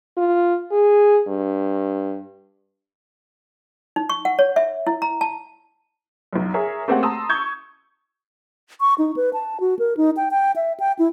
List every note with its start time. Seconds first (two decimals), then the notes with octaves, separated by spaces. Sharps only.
0.17 F4
0.72 G#4
1.28 G2
3.96 D#4
4.09 C#6
4.25 F#5
4.39 C#5
4.56 E5
4.87 E4
5.02 A#5
5.21 A5
6.33 B1 F#2
6.54 G#4 A#4 C#5 E5 A#5
6.88 A3 A#3 C4 G4 C#5 F#5
7.03 A5 A#5 C6 D#6 E6
7.29 C#6 G6 G#6
8.80 C#6
8.98 D#4
9.16 B4
9.33 A5
9.60 F#4
9.79 A#4
9.97 D#4
10.17 G5
10.31 G5
10.56 E5
10.80 G5
10.99 E4